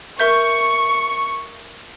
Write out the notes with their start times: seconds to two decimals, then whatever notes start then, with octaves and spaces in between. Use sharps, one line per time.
0.20 A#4 E5 C#6 G6